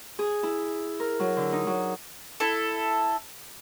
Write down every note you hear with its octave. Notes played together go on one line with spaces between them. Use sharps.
G#4
E4
A#4
F#3
D3
D#4
F#3
E4 A4